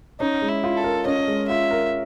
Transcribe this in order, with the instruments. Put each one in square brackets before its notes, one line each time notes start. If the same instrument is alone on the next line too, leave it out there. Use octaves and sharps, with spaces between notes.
[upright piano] C#4 [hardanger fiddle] D#4
[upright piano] G#3
[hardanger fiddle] E4
[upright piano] F4
[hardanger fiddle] A4
[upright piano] A#4
[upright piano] C#4 [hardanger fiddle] D#5
[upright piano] G#3
[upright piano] F4 [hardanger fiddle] E5
[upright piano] A#4